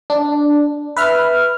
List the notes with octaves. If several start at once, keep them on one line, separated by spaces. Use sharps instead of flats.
D4
B4 E5 F6